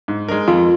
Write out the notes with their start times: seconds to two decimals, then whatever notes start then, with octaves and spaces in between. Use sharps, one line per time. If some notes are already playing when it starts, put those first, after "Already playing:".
0.08 G#2
0.29 G#3 D#4 A#4
0.48 F2 F4